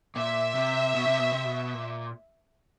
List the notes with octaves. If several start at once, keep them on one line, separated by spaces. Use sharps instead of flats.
A#2 E5
C3
B2
C3
B2
C3
B2
A#2